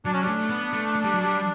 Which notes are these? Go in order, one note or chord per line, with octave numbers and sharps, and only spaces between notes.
F#3 D4
C#4
G3 A3 D4
B3
A3
A3
G3
F#3
G3